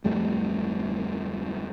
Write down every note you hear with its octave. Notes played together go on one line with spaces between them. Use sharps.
D1 F2 G3 A3